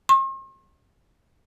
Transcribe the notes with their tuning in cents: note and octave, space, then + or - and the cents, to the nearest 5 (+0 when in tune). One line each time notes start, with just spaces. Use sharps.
C6 +45